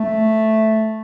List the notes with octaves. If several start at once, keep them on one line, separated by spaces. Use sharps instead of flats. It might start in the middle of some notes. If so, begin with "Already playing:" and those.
Already playing: A3